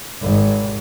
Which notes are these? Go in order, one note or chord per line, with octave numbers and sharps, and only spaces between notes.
G#1